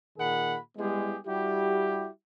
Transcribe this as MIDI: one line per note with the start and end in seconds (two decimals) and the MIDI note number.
0.18 0.57 46
0.18 0.57 51
0.18 0.57 68
0.18 0.57 70
0.18 0.57 78
0.18 0.57 83
0.77 1.17 55
0.77 1.17 56
0.77 1.17 59
0.77 1.17 64
0.77 1.17 67
0.77 1.17 68
1.26 2.08 55
1.26 2.08 64
1.26 2.08 66
1.26 2.08 67